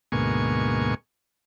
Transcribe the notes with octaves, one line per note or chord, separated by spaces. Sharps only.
D2 G#2 B2 A#3 G#5 C#6